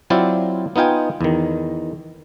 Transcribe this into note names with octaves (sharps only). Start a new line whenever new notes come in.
F#3 C4 E4 F4 C5 D5
B3 D#4 F4 G5 G#5
E2 D#3